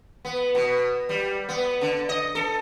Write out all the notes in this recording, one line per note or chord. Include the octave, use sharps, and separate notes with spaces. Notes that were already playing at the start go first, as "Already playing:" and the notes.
B3
B2
G3
B3
D3
D#5
A4